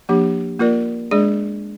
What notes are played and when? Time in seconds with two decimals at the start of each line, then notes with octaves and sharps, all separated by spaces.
0.09 F3 A#3 D4 G4
0.60 A#3 F4 A#4 D5
1.11 G#3 D4 G#4 D5